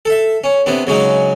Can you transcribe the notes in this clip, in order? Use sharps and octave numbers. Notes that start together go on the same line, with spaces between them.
A4 E5
C#4
C3 B3 D4
C#3 F#3 G#3 D#4